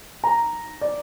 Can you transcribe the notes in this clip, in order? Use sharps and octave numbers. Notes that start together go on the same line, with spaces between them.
A#5
D5